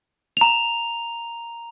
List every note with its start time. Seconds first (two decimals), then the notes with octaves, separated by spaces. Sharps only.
0.37 A#5 F7